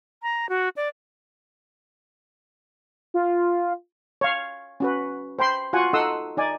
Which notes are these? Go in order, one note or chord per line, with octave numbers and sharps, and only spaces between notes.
A#5
F#4
D5
F4
C#5 F5
C#4 F#4 B4
C5 G5 B5 C6
F4 F#4 F#5 G#5
D#4 A4 F#5 C6 D#6 E6
D#4 D5 G#5